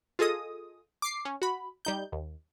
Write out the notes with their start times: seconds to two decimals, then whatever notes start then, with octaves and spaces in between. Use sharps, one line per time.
0.19 F4 G#4 A4 D#5 D#6
1.02 D6 C7
1.25 C#4
1.42 F#4 B5
1.85 G3 D#4 G6
2.12 D#2